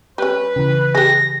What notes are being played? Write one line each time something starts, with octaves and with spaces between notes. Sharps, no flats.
G3 C#4 B4
C#3 E3
G4 G#4 A#6